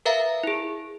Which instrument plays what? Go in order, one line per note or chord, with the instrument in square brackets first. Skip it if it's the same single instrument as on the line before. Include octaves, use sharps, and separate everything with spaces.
[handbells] A#4 B4 E5 F5 A#5
E4 G#4